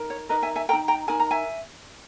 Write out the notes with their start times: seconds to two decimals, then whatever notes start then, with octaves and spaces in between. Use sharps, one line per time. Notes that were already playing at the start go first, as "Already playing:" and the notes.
Already playing: D#4 A#4
0.10 C#5
0.29 D#4 A#4 B4 D#5
0.42 E5 G#5
0.55 E5 G#5
0.69 A#4 G5 A#5
0.73 D#4
0.88 G5 A#5
1.08 D#4 A#4 G#5
1.20 A#5
1.31 E5 G#5